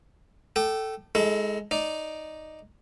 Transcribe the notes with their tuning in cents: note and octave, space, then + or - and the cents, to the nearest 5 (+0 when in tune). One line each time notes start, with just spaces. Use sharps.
A4 +0 G5 -25 D6 +40
G#3 +5 E4 -45 A4 +0
D#4 +0 D5 +0